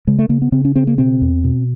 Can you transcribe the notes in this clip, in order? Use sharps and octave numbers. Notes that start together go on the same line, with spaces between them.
C#3 G#3
A3
C#3 A#3
B3
C#3 C4
C#4
C#3 C4
A#3
B2 C4
E2
B2